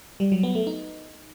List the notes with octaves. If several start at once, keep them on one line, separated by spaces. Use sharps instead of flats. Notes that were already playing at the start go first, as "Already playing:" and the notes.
G3
F#3
B3
A3
D#4